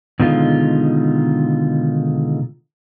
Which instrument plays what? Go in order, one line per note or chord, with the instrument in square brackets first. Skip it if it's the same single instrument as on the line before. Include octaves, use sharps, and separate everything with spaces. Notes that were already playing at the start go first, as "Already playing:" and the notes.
[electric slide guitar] B2 D3 D#3 G#3 F4